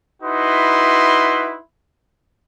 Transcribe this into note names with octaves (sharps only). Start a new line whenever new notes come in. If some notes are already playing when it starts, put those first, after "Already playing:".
D#4 E4 F#4 B4 C6